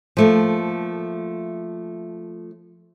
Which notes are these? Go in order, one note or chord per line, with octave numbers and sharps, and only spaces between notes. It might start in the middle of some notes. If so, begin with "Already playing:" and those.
F3 A3 A#3